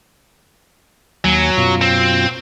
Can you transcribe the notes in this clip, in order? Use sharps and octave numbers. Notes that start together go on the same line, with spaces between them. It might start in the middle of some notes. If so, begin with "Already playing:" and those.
D#2 F#3 G#5
F#2 B2 F4
C4